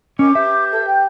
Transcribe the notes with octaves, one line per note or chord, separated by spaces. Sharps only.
C#4 A#4 D#5 G#5 D6
G4 B4 E5 G6
A4
G5